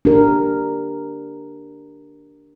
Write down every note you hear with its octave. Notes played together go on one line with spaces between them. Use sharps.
D4 G4 A#4